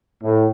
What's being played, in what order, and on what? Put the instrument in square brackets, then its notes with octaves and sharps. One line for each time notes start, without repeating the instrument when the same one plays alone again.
[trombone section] A2